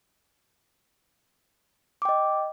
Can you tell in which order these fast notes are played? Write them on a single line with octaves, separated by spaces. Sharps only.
D6 G5 D#5